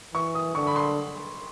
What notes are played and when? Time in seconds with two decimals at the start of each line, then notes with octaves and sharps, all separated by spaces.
0.14 E3 C#6
0.35 D#6
0.55 D3 C#6
0.67 B5
0.76 C6